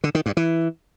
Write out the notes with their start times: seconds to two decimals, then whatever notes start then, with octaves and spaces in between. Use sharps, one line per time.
0.04 D3
0.15 D#3
0.26 G2
0.37 E3